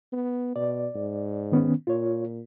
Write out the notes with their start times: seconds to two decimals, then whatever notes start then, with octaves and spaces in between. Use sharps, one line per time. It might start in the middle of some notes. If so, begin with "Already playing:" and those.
0.13 B3
0.56 B2 D5
0.95 G#2
1.52 D#3 B3 C#4
1.87 A#2 F4 C#5